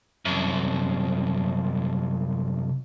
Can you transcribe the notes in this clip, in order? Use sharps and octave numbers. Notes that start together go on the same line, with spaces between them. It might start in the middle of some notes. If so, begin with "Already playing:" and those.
C2 F#2